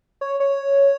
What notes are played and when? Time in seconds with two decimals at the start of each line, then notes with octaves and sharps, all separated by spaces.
0.21 C#5
0.40 C#5